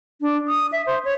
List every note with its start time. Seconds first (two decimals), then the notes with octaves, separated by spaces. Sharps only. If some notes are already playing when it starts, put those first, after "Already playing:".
0.21 D4
0.48 D#6
0.72 E5
0.86 C5
1.05 C#5